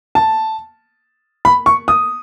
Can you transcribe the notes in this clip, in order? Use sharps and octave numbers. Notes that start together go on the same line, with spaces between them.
A5
B5
C#6
D#6